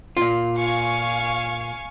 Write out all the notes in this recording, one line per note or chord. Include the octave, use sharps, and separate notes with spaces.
A#2 F4
F5 G#5 C#6